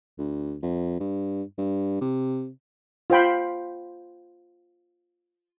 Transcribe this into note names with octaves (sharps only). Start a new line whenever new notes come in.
D2
F2
G2
G2
C3
F4 C5 G5 B5